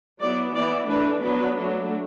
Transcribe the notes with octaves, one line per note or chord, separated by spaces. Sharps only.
F#3 B3 E4 D5
E3 B3 E4 D5
E3 A3 D4 B4
F#3 B3 D4 B4
F#3 A3 D4